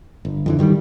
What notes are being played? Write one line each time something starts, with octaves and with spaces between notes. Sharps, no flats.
G1
F2 D3 E3
G2 D#3 F3 G3